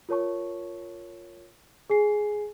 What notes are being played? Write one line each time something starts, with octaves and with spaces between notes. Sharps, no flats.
F4 A#4 C#5 A5 C#6
G#4 G#5 C7